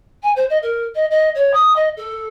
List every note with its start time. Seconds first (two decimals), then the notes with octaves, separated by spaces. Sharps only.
0.23 G#5
0.36 C5
0.50 D#5
0.63 A#4
0.95 D#5
1.11 D#5
1.35 C#5
1.54 D#6
1.76 D#5
1.97 A4